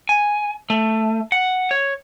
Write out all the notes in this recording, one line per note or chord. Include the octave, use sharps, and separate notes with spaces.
G#5
A3
F#5
C#5